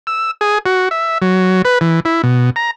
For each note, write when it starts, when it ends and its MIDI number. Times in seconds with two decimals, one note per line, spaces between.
0.07 0.31 88
0.41 0.58 68
0.66 0.89 66
0.91 1.18 76
1.22 1.62 54
1.65 1.79 71
1.81 2.00 52
2.05 2.22 64
2.23 2.50 47
2.56 2.71 82